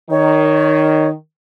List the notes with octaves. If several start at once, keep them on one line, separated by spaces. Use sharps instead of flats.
D#3 C#5